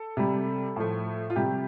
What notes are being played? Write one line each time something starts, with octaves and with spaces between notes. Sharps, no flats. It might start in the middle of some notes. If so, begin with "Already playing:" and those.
Already playing: A4
C3 G3
A2 F3 A3
F4
C3 G3 G4